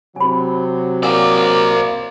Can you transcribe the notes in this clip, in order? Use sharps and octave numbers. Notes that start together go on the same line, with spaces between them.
C3 F#3 G#5 B5
A#3 C5 D5 F#5 G#5 E6